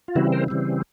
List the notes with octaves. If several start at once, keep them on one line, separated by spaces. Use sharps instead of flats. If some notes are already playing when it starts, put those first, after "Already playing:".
F4
C#3 E3 G3 C4 E4 F#4
A#4 C5
C#3 E3 G3 C4